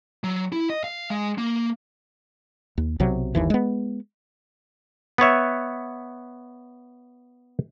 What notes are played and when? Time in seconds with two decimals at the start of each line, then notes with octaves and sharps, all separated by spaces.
0.24 F#3
0.52 E4
0.70 D#5
0.84 F5
1.10 G#3
1.38 A#3
2.78 D#2
3.00 B1 C3 F#3
3.35 G1 D#2 E3
3.50 G#3 B3
5.18 B3 B4 C#5 E5